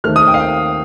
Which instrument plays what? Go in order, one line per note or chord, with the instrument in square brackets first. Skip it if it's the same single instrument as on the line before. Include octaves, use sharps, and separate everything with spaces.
[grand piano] D#2 D#3 A3 C4 F6
D#6
G5
F5
G5